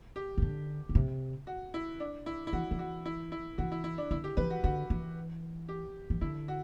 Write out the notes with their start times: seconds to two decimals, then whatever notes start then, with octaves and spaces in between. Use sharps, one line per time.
0.16 G4
0.38 C3
0.42 D3
0.89 D3
0.95 C3
1.47 F#4
1.74 E4
2.00 D4
2.26 E4
2.47 E4
2.53 E3 F#4
2.71 E3
2.79 F#4
3.06 E4
3.32 E4
3.58 E3 F#4
3.72 E4
3.84 E4
3.98 D4
4.11 D3 E4
4.24 G4
4.37 E3 B4
4.50 F#4
4.64 D3 F#4
4.90 E3
5.69 G4
6.10 E3
6.21 D3 E4
6.48 F#4